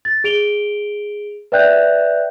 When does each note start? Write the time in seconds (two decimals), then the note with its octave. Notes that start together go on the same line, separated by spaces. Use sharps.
0.05 A6
0.24 G#4 D7 F7 G7
1.52 B4 D5 E5 G5 F#6 G6